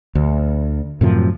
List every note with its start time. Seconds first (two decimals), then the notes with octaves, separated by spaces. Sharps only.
0.15 D2
1.01 F#2 A2 C3 F3